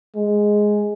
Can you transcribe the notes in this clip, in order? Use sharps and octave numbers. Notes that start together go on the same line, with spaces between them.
G#3